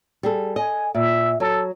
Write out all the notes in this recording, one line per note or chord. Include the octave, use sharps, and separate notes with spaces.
G3 G#4 A4
D#5 G#5
A#2 E5
F#3 A4